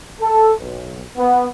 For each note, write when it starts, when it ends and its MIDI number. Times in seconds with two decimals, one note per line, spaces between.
0.21 0.52 69
0.58 1.01 35
1.18 1.47 59